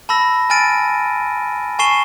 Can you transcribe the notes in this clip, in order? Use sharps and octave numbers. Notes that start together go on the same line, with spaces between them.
A5 B5 E6 A#6
G#5 A5 F6 A6 D7 D#7
G#5 A5 C#6 C7 E7 G7